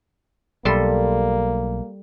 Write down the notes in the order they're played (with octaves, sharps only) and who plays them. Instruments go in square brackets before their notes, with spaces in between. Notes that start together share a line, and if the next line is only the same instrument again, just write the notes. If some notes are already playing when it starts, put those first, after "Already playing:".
[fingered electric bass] B1 [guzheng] G3 A4 C6 [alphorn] A#3